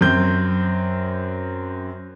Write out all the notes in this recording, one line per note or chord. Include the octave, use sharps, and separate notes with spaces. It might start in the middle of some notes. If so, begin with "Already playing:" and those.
F#2 C4 G6